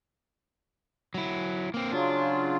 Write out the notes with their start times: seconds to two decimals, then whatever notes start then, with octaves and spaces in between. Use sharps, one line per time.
1.14 F#3 E4
1.74 A#3 C4
1.92 C#3 F#3 D4 F4